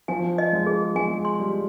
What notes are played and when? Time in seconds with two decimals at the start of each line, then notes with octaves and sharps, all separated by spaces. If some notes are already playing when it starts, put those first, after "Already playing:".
0.08 F3 G#5
0.38 D#5
0.53 G#3
0.66 G#4
0.95 G#3 G#5
1.25 C6
1.40 G3